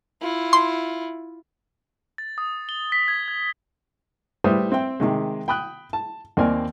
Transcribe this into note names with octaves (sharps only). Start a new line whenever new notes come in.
E4 F4
C6
A6
D#6
G7
B6
G#6
G#6
A2 G3 B4 C5 E5 D#6
C4 E5 G5
C3 D#3 G#3
G5 B5 D#6 F#6
A5
D#2 A#3 C4 D5 G#5 F6